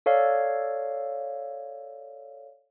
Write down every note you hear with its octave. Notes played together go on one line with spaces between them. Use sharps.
A4 C#5 D5 F5